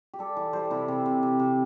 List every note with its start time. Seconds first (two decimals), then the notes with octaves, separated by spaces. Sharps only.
0.14 G4
0.19 G3 A4
0.37 E3
0.53 G3 C5
0.71 C3 E4
0.88 C3 C4
1.06 C3
1.23 C3
1.40 C3